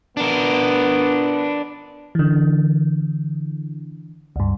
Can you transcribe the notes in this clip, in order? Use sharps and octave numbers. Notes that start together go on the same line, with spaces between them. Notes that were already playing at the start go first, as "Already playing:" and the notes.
B3 D4 A#4
D3 E3
C#2 G2